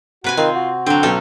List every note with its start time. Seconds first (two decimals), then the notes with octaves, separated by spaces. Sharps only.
0.24 C3 F#4 B4 G#5
0.37 D#3 C4 F4
0.55 F#4
0.86 D3 F#3 C4 G5
1.03 B1 C#4 A4